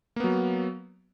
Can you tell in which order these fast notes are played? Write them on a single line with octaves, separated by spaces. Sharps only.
A#3 B3 F#3